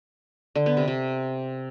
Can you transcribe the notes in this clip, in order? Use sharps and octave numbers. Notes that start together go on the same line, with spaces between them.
D3
B3
C3
C3